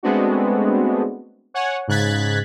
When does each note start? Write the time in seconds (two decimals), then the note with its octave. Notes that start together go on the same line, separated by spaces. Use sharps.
0.03 G#3 A3 B3 C4 D4 F#4
1.54 C#5 F#5 G#5
1.88 G#2 C#3 F#6 G#6 A6 B6